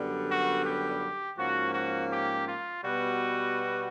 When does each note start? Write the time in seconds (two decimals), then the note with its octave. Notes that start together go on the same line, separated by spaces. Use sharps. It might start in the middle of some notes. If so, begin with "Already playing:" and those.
Already playing: F#2 D3 G3 B3
0.29 F#4
0.65 G4
1.38 G#2 F3 A#3 C#4 F#4
1.73 F#4
2.11 G4
2.46 F4
2.82 B2 G3 B3 F#4